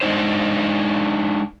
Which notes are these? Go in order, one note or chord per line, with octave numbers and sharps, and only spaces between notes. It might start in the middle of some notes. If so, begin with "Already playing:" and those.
G#3 D4 D#4 C5